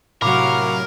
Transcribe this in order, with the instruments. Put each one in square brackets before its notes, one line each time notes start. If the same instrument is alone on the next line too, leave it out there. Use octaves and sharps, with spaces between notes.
[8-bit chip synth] A2 C3 F#3 [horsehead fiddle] F#4 F5 [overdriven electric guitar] A#4 [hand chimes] B5 D6